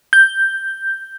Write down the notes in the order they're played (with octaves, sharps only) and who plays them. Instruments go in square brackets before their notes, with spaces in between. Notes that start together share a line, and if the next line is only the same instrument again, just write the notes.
[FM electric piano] G6